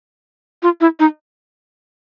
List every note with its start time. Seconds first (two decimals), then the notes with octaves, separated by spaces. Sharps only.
0.63 F4
0.81 E4
1.00 D#4